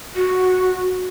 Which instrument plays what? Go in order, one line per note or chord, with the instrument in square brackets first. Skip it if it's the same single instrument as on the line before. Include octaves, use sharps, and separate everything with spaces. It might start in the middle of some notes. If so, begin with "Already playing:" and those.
[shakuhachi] F#4